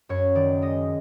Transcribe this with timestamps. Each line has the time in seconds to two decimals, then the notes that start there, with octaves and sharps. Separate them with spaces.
0.09 F#2 C#5
0.35 D#3 D5
0.62 G#3 D#5